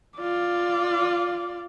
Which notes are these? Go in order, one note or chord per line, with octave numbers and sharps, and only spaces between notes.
F4 D5